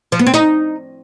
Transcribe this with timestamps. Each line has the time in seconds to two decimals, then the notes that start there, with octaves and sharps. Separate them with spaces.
0.12 F3
0.19 B3
0.27 C4
0.34 D#4